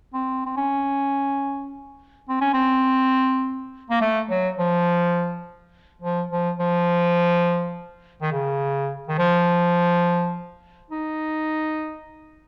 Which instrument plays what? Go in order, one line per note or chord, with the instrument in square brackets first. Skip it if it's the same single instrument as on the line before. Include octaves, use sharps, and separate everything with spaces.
[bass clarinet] C4
C4
C#4
C4
C#4
C4
A#3
A3
F#3
F3
F3
F3
F3
D#3
C#3
D#3
F3
D#4